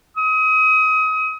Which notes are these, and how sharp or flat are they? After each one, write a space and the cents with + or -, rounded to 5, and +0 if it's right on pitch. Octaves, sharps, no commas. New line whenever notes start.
D#6 +30